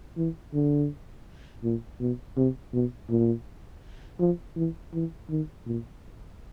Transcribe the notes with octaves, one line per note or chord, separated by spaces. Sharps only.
E3
D3
A#2
B2
C3
B2
A#2
F3
E3
E3
D#3
A#2